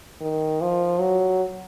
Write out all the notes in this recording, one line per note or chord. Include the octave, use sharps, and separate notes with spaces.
D#3
F3
F#3